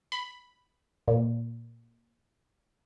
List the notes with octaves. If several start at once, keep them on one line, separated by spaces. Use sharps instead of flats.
B5
A#2